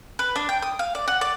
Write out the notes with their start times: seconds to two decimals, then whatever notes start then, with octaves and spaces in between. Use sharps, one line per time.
0.19 B4
0.36 D4
0.49 G5
0.62 D#6
0.79 F5
0.95 D5
1.08 F#5
1.21 D5